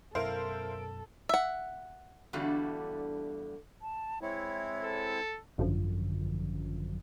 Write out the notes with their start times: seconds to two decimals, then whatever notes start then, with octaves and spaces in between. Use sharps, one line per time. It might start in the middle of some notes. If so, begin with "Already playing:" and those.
0.15 F#2 B2 E4 A4 A#4 C5 F5 D7
1.29 E5 F#5
2.33 E2 G2 D3 G3 A3 F#4
3.82 A5
4.22 G#3 C4 E4 C#5
4.84 A4
5.58 G#1 F#2 D3 F3